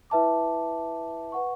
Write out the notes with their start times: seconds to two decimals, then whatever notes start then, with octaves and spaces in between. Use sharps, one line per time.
0.10 E4 B4 E5 A5 D6
1.32 B4 F#5 C#6